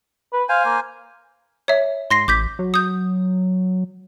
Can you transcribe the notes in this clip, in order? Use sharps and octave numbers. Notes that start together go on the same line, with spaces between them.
B4
C5 F5 G#5
A#3
C#5 E5
G#2 C6 A#6 C7
A1 D6 G6 B6
F#3
D#6 G6